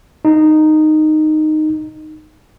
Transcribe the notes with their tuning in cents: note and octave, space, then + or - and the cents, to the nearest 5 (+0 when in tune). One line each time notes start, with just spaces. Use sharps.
D#4 -10